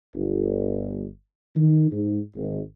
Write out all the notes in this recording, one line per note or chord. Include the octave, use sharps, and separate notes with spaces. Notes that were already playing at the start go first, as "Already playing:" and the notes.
G1
D#3
G#2
G#1